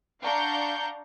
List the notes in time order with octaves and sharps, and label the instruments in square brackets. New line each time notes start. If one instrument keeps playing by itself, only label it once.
[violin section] D4 F5 F#5 A#5 C#6 G6